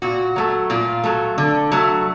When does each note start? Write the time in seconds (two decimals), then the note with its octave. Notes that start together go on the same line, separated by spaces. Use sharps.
0.02 A#2 F#4
0.36 F#3 A3
0.70 A#2 F4
1.04 F#3 A3
1.38 D3
1.72 F#3 A3